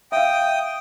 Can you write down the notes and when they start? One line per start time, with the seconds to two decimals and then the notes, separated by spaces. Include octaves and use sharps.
0.12 E5 F5 G5 D#6